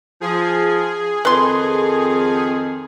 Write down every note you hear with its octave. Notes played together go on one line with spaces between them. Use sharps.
F3 G#4
F2 D#3 B4 C6